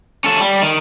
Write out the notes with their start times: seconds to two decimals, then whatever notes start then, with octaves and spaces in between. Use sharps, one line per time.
0.24 C#4 A4
0.39 G3
0.62 D#3